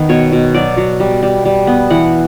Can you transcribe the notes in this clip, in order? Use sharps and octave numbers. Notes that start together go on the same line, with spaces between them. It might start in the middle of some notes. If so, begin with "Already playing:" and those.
Already playing: D#3 B3
B2 C#5
B2
F#3 D5
F#3
G3
G3
G3
B3
E3 F#5